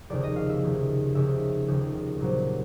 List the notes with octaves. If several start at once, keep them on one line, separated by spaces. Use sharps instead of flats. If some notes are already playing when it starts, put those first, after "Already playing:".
F1 D#2 C#3 D5
D#5
F5
E5
F1 D#2 C#3
F1 D#2 C#3 E5
F1 D#2 C#3
C2 A#2 F#3